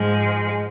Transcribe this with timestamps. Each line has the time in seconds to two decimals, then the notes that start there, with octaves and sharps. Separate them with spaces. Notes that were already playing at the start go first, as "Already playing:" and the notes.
Already playing: G#2 F3 G#3